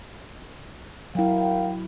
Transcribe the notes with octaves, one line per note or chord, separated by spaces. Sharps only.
F#3 E4 A#4 F5 G5